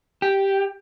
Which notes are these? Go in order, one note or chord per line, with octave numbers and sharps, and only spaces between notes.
G4